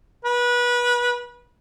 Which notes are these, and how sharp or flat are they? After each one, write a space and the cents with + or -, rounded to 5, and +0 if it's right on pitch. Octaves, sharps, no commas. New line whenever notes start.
B4 -25